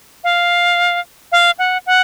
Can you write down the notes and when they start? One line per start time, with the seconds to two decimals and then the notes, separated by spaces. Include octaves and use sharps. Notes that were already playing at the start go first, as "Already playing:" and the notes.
0.24 F5
1.32 F5
1.59 F#5
1.86 F#5